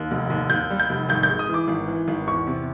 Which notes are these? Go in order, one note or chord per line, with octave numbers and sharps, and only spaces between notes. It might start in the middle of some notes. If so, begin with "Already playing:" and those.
Already playing: D#2
F1
D#2
D#2 G6
G3
G6
F1
G#1 G6
G6
G#3
D#6
E3
D6
G#1
E3
G#1
E2 C#6
C3